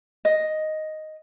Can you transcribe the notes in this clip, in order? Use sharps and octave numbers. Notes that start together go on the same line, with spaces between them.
D#5